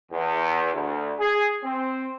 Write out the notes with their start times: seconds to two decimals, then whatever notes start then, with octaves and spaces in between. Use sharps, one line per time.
0.12 E2
0.73 D2
1.19 G#4
1.64 C4